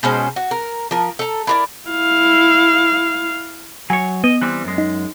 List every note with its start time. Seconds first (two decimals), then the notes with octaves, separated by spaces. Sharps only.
0.03 B2 G#3 C#4 C5
0.36 F#4
0.51 A#4
0.91 F3 A#4
1.19 A4 A#5
1.47 E4 A#4 D5
1.90 E4 F5
3.90 F#3 C#5 G#5
4.24 B3 D#5
4.42 E3 G3 C4 F#6
4.64 F#2 G#3
4.78 D#4